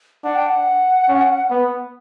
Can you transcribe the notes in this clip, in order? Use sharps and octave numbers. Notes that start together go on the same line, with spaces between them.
D4 F#5
G5
F#5
C#4
B3